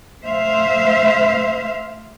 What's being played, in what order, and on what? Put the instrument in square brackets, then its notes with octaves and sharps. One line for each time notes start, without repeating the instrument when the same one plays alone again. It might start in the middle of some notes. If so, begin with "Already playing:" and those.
[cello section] A3 C5 E5 F5